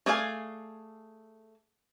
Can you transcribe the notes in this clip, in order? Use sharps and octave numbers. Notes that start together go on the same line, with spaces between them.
A3 G#4 D5 F5 G#5